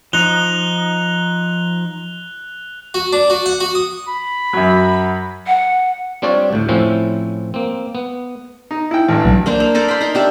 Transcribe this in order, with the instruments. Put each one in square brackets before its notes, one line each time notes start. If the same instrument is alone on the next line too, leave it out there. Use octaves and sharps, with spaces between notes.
[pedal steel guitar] F3 D#4 [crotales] F#6 F7 G7
[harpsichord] F#4
D4
F#4
F#5
F#4
D#6
[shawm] B5
[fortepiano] F#2 F#3
[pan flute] F#5
[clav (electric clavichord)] G3 C4 D4 F4 C#5 D5
D2 A2
A2 F3 C4 C#4 E4
A#3 C4
B3
[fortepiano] D#4
E4 G5
A1 G2
[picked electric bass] B1 F#3 G3
[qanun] A#3 D4 C5
A#3
A4 A#4 C5 D5
B5 C6
D#4 A#4
D4 G4 E5